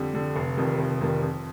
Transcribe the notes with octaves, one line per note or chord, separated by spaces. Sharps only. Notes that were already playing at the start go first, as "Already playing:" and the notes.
Already playing: F2 D3 G3
D3 G3
F1
F2 D#3 G3
F1
F2 D#3 G3
F2